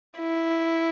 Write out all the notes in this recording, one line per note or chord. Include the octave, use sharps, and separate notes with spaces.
E4